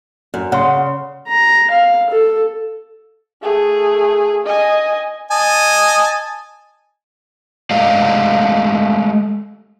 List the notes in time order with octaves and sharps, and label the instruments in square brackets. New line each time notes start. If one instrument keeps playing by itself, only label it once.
[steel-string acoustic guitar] F#2
[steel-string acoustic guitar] C#3 [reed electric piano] F#5 C6
[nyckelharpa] A#5
F5
A4
[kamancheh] A3 G#4
D#5 G#5
[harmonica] D#5 G#5 A5
[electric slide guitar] G#3 A3 G4 D5 D#5 F5